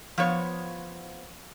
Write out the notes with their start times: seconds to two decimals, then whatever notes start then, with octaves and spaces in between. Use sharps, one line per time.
0.18 F3 B3 C#5